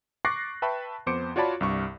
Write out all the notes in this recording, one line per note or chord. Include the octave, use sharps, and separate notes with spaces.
C#6 D6 F#6 A6 A#6 C7
B4 E5 G5 A5 B5 C#6
F2 B3 C5 D6 C#7 D7
F4 F#4 C#5 D5 A5 B5
C2 G2 C#6